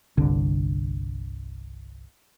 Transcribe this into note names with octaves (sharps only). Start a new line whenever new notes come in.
G1 C2 D3